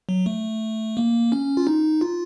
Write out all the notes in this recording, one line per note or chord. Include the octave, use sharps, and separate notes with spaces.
F#3
A3
A#3
C#4
F4
D#4
F4